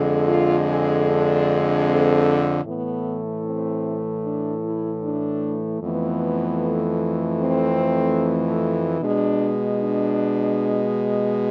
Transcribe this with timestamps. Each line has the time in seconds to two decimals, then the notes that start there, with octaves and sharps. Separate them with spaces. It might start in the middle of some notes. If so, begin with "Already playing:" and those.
Already playing: F2 D3 G#3
0.27 F4
0.67 G#4
1.06 D4
1.85 C4
2.64 A2 E3 A3 B3
3.44 C4
4.24 D4
4.64 E4
5.03 D4
5.82 F2 E3 A3 B3
7.41 C4
9.00 B2 G#3 D4
9.79 D4